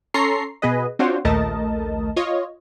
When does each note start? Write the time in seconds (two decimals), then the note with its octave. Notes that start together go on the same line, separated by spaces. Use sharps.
0.14 C#4 A4 A#5 C6 C#6 C7
0.62 B2 B3 G#4 B4 D#5
0.99 C4 D4 F4 F#4 C5 C#5
1.25 A#1 D#2 A3 A#4 D#5 A5
2.16 F4 C#5 D#5